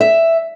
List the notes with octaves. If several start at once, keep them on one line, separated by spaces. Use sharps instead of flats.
E5